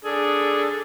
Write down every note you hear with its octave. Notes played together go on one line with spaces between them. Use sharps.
D4 G#4 A4